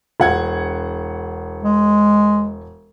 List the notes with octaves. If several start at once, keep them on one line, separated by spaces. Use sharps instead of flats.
E1 F#5 G#6
G#3